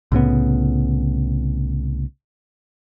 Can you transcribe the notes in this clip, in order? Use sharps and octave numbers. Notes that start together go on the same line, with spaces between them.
C2 A2 C#3 B3